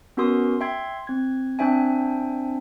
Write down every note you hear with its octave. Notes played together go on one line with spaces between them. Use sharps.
B3 C#4 F#4 A#4 C6 D#6
E5 G5 C6 G#6
C4 G#6
C4 D4 C5 E5 G5 G#5